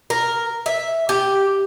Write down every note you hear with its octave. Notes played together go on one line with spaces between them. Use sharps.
A#4
E5
G4